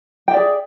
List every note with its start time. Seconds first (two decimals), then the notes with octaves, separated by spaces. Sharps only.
0.28 G5
0.31 E5
0.34 D5
0.36 G#4